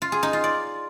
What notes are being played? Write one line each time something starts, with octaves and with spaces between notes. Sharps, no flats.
F4
G#4
D#4
F4
D5